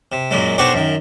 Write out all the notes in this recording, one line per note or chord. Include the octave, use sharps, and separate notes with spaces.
C3
F#2 A#2 F#3 G#3
B1 D4 F#4 G4 C5 C#6
F#2 D#3